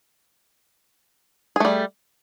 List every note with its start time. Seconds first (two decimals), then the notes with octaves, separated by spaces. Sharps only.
1.56 G#4
1.60 A3
1.65 G3